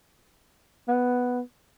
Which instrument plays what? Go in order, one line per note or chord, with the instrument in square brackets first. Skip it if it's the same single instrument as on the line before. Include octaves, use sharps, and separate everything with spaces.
[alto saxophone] B3